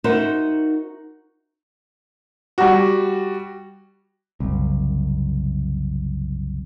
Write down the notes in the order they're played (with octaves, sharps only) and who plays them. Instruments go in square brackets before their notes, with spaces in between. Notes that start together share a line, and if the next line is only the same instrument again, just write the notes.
[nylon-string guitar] D#4 F#4 A#4 C5 E5 F#5
[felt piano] G3 F#4
[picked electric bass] F#1 C2